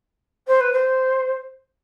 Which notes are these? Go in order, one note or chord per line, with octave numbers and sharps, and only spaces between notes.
C5
B4
C5